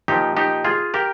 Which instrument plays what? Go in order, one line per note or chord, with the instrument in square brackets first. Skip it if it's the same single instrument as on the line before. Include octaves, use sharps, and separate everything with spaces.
[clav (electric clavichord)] A#2 F3 D#4 G4
D#4 G4
F4 G#4
G4 A#4